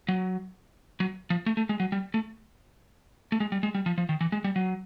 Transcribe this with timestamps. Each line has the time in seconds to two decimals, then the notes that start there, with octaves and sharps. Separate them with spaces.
0.08 F#3
1.00 F#3
1.30 F3
1.46 A3
1.57 A3
1.69 G#3
1.80 F#3
1.92 G3
2.14 A3
3.32 A3
3.40 G#3
3.52 G3
3.63 G#3
3.75 G3
3.86 F3
3.98 F3
4.09 D#3
4.21 E3
4.32 G#3
4.44 G3
4.56 F#3